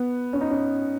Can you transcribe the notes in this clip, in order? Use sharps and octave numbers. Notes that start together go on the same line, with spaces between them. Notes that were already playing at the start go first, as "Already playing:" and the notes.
Already playing: B3
C#4
D#4
C#4